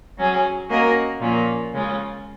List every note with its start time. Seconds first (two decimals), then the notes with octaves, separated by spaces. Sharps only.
0.18 F#3 C#4 G#4
0.70 A#3 C#4 F#4 A#4 D#5
1.21 A#2 F3 A#3 C#4
1.73 C#3 G#3 C#4 F4